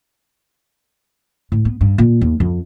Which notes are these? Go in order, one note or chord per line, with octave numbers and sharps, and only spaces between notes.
A2
B3
G2
A#2
D#2
F2